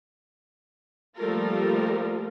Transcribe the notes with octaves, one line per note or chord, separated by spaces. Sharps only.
F3 G3 A3 A#3 F4 A#4